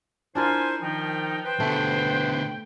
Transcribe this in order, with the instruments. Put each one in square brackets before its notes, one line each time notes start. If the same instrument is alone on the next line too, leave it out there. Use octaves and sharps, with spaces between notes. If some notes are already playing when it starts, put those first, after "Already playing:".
[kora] D4 F4 A#4 [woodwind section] E4 C5 [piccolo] G#5
[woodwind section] D#3 F3 D#4 [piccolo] G5
[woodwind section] B4 C5 [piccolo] G5
[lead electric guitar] B2 D3 [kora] A3